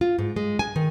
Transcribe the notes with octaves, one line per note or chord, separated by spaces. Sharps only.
F4
G#2
G#3
G#5
D#3